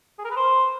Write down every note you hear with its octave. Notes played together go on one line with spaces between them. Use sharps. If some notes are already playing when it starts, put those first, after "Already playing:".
G#4
A#4
B4
C5